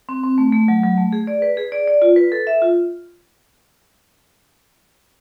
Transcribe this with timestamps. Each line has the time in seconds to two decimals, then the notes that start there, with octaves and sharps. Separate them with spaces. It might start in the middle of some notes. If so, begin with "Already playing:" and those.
0.09 C4
0.24 C4
0.38 A3
0.52 A3
0.68 F#3
0.83 F#3
0.98 A3
1.12 G#4
1.27 D5
1.42 B4
1.57 G#4
1.72 D5
1.88 D5
2.02 F4
2.16 B4
2.32 A4
2.47 E5
2.62 F4